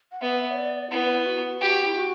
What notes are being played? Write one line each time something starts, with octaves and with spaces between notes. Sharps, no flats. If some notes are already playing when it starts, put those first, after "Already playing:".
F#5
B3 E5
C#5
D5
B3 E4
F#4
F#4 G4
E4
F#4